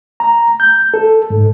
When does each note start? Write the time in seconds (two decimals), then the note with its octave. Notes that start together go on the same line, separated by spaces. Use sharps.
0.20 A#5
0.60 G6
0.94 A4
1.30 G#2